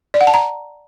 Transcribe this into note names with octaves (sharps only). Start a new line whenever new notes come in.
D5
F#5
A5
A#5